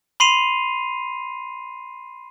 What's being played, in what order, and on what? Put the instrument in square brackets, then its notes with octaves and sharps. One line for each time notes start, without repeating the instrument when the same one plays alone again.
[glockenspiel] B5 C6 C7 D#7 F7